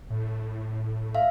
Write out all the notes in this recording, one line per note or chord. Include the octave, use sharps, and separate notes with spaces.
A2
E5 F5